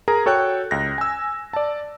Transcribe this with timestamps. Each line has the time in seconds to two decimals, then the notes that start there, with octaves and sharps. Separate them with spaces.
0.08 G#4 A#4 A#5
0.26 F#4 A4 C#5 G5 F#6
0.71 C#2 A#6
0.98 G#5 E6
1.53 D5 A5